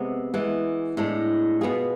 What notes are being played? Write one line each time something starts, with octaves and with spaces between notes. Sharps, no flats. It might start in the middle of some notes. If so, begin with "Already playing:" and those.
Already playing: C3 G#3 B3
E3 G#3 B3
A2 G#3 D4
B2 B3 F4 G#4